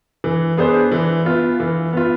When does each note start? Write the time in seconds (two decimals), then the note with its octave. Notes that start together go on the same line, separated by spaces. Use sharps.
0.24 E3
0.57 B3 D4 G#4 C5
0.91 E3
1.25 B3 F4
1.60 E3
1.93 B3 F4